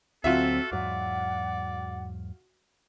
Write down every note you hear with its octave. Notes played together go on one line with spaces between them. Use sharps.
D2 D3 F#3 C4 F4 F#4 A4 E5
E2 G#2 F#3 D5 F#5